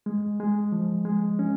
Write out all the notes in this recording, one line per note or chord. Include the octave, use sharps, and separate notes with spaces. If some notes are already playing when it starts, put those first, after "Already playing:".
G#3
G#3
F3
G#3
C#4